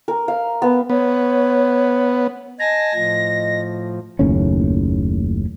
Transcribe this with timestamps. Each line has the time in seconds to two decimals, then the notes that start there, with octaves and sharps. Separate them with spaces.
0.08 A#4
0.28 F5
0.62 B3
0.90 B3 C#5
2.59 D#5 G#5 A5 A#6
2.94 A2 F3
4.19 F#1 D#2 A2 C#4